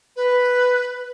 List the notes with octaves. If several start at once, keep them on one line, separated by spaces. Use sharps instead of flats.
B4